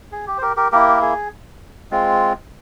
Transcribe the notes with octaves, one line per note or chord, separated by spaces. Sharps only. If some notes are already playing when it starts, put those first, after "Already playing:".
G#4
G4
C5
G4 A#4
G4 A#4
A#3 E4 G4 A#4
G#4
G#3 C4 F4